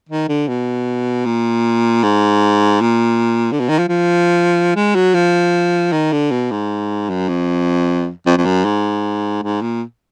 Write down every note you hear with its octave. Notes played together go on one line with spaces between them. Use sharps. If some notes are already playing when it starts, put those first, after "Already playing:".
D#3
D3
B2
A#2
G#2
A#2
D3
B2
D#3
F3
F3
G#3
F#3
F3
D#3
D3
B2
G#2
F#2
F2
F2
F2
F#2
G#2
G#2
A#2